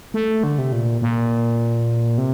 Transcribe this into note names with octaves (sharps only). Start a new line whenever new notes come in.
A3
D3
C3
A#2
A#2
C3